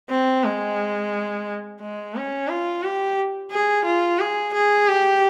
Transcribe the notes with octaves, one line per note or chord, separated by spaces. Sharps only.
C4
G#3
G#3
C#4
F4
G4
G#4
F4
G#4
G#4
G4